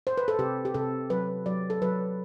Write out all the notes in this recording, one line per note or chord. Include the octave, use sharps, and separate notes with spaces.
C5
B4
A4
C3 G4
G4
C3 A4
F#3 B4
F#3 D5
A4
F#3 B4